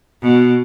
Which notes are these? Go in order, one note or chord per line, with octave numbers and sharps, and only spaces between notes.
B2